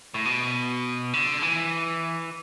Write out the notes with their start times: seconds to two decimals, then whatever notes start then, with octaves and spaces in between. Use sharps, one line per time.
0.14 A2
0.25 B2
1.13 D3
1.42 E3